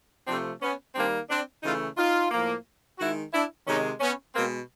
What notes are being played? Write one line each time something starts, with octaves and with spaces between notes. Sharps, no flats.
C3 F3 A3 C4 D4
B3 C#4
D#3 G3 A#3 C4 D4
C4 D4
C#3 E3 A3 D#4 F4
D#4 F4
A2 F3 A#3
D#3 G#3 E4 F#4
D4 E4
C3 D#3 G#3 C#4 D#4
B3 C#4
B2 G#3 A#3 C4